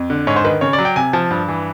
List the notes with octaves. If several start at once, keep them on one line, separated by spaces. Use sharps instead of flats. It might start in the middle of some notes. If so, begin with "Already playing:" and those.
Already playing: F2
D3
G#2 C#5
C5
D#3 B4
C#3 C#5
D5
F#3
G5
C3 G#5
F3 A5
G2
E3